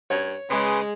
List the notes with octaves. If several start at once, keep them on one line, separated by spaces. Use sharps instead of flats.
G2 C#5
C#3 G#3 G#4 B4 C6